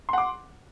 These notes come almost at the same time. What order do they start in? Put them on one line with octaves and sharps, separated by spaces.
C6 F#5 D6